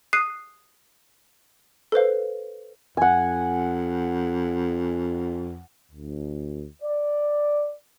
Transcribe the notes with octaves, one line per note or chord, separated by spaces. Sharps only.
D#6 F#6 C7 D#7
A4 B4 C5 F5
F2 F#5 G#5
D2
D5